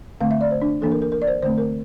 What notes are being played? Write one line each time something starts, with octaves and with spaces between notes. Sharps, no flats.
D3 A3 C4 F5
E5
D5
C5
D4
E3 A#3 D4 A4
A#4
A#4
A#4
D5
C5
D3 A3 C4 C5
A#4